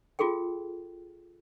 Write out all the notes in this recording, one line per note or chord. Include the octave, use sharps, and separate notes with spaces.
F4 F#4 G#4 A4 G5